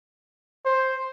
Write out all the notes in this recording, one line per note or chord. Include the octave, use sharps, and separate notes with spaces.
C5